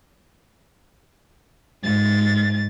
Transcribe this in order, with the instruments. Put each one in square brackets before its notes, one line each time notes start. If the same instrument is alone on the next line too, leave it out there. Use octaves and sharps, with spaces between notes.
[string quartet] G#2 A6